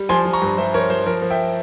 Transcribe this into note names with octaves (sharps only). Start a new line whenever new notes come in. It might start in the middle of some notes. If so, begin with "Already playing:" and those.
Already playing: G3
F3 G#5 C6
F3
A#5 C#6
G2
G2 C5 E5
F3 A#4 C#5
F3 C5
F3 A#4
F3
E5 G5